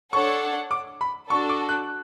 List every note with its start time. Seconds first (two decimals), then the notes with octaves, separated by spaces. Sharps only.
0.12 D4 A4 C#5 F#5 C#6
0.71 D6
1.01 B5
1.30 D4 F#4 A4 C#6
1.49 D6
1.69 F#6